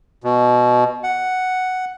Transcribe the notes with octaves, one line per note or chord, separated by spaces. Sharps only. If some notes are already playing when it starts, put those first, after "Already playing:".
B2
F#5